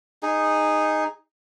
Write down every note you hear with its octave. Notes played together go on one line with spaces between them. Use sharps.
D#4 G#4